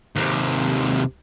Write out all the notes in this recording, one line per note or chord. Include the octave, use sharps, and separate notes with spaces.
D#2 C3